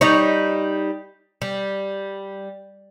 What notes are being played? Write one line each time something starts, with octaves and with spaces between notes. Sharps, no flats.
G3 D#4 C#5
G3